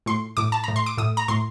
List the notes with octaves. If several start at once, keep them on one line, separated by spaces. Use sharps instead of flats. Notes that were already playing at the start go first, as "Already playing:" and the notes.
A2 C6
A2 D6
A5
A2 A#5
C6
D6
A2 D#6
A#5
A2 C6